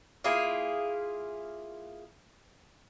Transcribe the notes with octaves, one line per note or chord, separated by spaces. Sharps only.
A#3 E4 F4 G#4